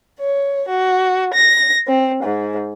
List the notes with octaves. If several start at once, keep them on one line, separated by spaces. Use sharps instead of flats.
C#5
F#4
A#6
C4
G#2